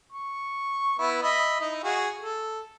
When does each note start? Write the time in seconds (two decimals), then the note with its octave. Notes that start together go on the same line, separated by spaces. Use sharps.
0.12 C#6
0.99 B3 E4
1.23 D#5 E5 B5
1.60 D#4 E4 D#5
1.84 F#4 G#4 F5
2.19 A4